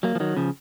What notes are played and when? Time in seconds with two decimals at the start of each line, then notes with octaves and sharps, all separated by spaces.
0.03 F#3 A#3
0.15 F3
0.20 D#3 F#3
0.37 C#3 F3